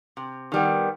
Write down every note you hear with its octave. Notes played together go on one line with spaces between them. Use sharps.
C3
D#3 G3 B3